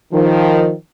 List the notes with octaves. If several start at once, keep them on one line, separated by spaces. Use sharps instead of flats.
D#3 F3